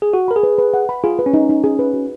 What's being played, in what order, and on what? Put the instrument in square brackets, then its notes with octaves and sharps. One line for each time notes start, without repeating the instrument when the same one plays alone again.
[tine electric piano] G#4
[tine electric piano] F#4 [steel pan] F#5
[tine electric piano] A#4 [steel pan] B5
[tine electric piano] G#4
[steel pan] B4
B4
F#5
B5
[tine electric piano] F4 [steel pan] G#4
[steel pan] B4
[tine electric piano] C#4
[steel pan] D#4
D#4
G#4
B4
F#4